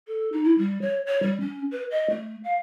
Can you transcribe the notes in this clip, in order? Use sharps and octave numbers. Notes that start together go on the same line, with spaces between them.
A4
D#4
E4
G3
C#5
C#5
G3
C#4
B4
D#5
A3
F5